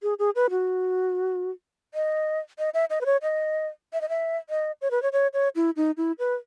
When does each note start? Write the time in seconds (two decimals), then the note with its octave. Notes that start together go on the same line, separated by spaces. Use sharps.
0.03 G#4
0.19 G#4
0.35 B4
0.50 F#4
1.94 D#5
2.59 D#5
2.74 E5
2.90 D#5
3.01 B4
3.06 C#5
3.22 D#5
3.93 E5
4.01 D#5
4.09 E5
4.50 D#5
4.82 C#5
4.91 B4
5.02 C#5
5.13 C#5
5.34 C#5
5.56 E4
5.76 D#4
5.97 E4
6.19 B4